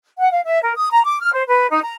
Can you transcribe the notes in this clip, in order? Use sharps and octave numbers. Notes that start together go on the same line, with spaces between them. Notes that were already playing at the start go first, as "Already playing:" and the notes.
F#5
F5
E5
A#4
D#6
A#5
D6
F6
C5
B4
D#4
A#5